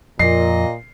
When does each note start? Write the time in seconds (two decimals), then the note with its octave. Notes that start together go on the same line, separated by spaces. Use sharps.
0.19 F2 A#2 D#5 C7